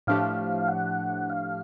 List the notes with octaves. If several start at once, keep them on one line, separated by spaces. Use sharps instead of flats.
A2 F3 A3 D4 G4 F5
F#5
F5